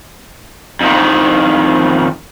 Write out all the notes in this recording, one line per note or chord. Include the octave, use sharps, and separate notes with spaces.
F2 D#3